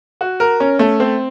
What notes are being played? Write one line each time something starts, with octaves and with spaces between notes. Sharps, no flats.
F#4
A#4
C#4
A3
C4